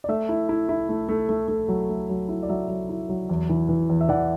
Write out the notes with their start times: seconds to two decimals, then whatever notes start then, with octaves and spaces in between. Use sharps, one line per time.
0.04 D5
0.09 A3 E5
0.29 E4
0.49 E4
0.69 E4
0.89 A3
1.09 A3
1.29 A3
1.48 A3
1.68 F#3
1.89 A3
2.09 F#3
2.29 E4
2.43 D5
2.49 F#3 E5
2.69 F#3
2.89 E4
3.09 F#3
3.29 E2
3.49 E3
3.69 E3
3.89 E2
4.01 E5
4.09 E3 D5 F#5